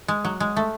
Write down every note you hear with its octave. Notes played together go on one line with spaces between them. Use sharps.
G#3
F#3
G#3
A3